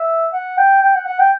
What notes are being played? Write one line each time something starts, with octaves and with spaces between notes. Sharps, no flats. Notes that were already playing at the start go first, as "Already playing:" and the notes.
Already playing: E5
F#5
G5
G5
F#5
F#5
G5